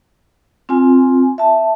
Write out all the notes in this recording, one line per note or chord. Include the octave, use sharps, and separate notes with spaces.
C4 F4 G#5
E5 A5